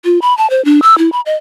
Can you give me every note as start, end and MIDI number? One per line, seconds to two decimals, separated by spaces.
0.05 0.19 65
0.22 0.36 83
0.38 0.49 81
0.50 0.63 72
0.65 0.80 62
0.82 0.97 88
0.98 1.11 64
1.12 1.21 83
1.26 1.35 75